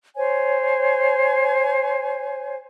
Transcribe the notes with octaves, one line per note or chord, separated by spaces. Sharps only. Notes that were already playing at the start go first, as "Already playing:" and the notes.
C5 C#5 G#5